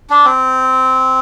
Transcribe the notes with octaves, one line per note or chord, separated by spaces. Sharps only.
D4
C4